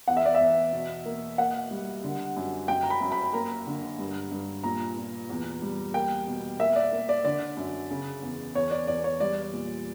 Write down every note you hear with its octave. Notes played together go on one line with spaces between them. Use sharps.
E2 F#5
E5
D5
E5
E2
B2
A#3
A#3 F#5
G3
D3
F#2
F#2 G5
A#5
B5
F#2
B5
A#3 A#5
D3
G2
G2
A#2 A#5
A#2
E2
G3
A#3 G5
B2
A#3 E5
D5
A#3
D5
D3 D5
F#2
C#3
E2
E2 C#5
D5
E2 D5
C#5
G3 D5
A#2